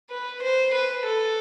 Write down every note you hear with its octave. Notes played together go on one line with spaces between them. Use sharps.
B4
C5
B4
A4